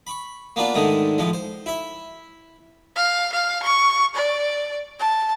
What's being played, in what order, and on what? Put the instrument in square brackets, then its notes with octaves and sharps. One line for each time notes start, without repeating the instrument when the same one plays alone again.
[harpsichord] B5 C#6
A#3 B3 D4 F4
G#2 D3 D#3 G#3 A3
A2 F3 G#3
C5
E4 E5
[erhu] F5
F5
C#6
D5
A5